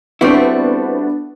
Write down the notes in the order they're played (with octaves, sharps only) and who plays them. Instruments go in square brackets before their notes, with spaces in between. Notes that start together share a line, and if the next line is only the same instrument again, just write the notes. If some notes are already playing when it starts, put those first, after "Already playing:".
[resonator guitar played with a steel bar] G3 A3 F#4 [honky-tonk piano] B3 D4 [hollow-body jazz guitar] C4 E4